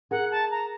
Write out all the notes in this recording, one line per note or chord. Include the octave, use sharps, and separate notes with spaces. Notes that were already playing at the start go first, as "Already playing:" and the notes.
G#4 A#4 F#5
A5
A#5